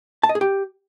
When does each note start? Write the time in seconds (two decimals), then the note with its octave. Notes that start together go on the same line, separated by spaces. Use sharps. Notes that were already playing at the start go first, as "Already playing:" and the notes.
0.23 A5
0.29 D#5
0.35 G#4
0.41 G4